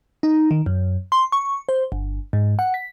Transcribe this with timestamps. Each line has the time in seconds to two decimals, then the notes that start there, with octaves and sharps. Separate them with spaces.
0.23 D#4
0.51 D#3
0.66 F#2
1.12 C6
1.32 C#6
1.69 C5
1.92 G1
2.33 G#2
2.59 F#5
2.74 B6